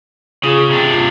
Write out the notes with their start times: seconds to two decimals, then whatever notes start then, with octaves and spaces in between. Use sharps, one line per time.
0.44 C#3 F4 G#4 D#6
0.70 C3 D4
0.93 F4 C7